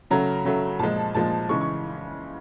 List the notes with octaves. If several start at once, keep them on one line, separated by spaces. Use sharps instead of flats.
C#3 F#3 A3 A#5
C#3 F#3 A3
A#2 F3 G#3 A5
A#2 F3 G#3 A5
C#3 E3 G#3 C#6
C#6